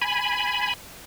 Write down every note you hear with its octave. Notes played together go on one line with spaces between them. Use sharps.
G#5 B5